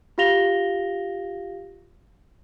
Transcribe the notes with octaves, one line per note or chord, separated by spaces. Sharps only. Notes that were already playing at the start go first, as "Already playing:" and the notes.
F4 G4 F5 A#6 F7 G7